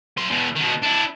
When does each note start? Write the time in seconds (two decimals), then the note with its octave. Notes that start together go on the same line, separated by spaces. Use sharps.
0.17 F#3 C6
0.30 E2 B2
0.56 B2 D#3
0.82 D4 E4